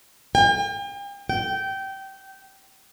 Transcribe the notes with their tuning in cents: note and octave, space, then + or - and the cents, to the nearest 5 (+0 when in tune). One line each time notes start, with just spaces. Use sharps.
G5 +45
G5 -20